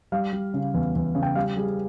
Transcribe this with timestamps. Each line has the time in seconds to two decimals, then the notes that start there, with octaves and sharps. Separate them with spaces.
0.12 G3 F5
0.33 G3
0.54 C#3
0.74 E2
0.95 E2
1.15 C#3
1.23 G5
1.35 G3 F5
1.57 G3 G#4